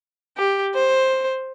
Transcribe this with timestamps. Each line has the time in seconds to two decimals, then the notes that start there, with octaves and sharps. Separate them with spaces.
0.38 G4
0.75 C5